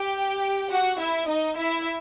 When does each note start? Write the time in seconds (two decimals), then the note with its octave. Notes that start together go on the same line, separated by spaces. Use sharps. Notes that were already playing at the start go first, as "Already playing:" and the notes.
Already playing: G4 G5
0.71 F#4 F#5
0.99 E4 E5
1.28 D#4 D#5
1.57 E4 E5